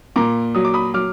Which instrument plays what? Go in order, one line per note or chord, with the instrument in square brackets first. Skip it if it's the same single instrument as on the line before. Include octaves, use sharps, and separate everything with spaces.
[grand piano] A#2 A#5 D6
F#3 D#6
D6
B5 D#6
F#3 D6 F6